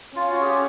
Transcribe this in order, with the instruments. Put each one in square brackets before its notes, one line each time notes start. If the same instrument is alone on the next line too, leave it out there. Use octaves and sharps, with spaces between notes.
[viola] C#4 [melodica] F4
[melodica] F#4
G#4
G4